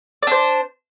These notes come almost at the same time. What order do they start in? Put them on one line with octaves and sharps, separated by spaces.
D5 D4 C5